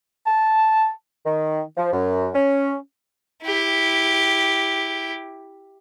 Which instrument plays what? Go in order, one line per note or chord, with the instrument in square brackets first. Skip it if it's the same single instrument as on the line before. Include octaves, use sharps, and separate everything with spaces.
[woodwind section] A5
D#3
F3
F#2
C#4
[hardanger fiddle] E4 G4